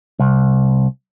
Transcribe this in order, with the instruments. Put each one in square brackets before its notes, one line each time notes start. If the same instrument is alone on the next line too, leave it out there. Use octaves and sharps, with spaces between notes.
[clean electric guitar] C2